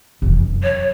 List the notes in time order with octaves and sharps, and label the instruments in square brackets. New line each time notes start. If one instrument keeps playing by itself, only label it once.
[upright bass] F1 E3
F#2
[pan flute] C#5